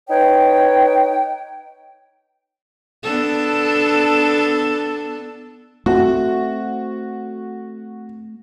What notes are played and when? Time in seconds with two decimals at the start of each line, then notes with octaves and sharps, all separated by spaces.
0.10 D#4 B4 C#5 G5
3.03 B3 D4 A4
5.86 A3 B3 C4 F#4